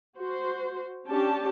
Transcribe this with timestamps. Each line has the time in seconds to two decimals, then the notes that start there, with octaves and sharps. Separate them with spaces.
0.18 F#4 C5
1.08 C#4 D4 G4 A5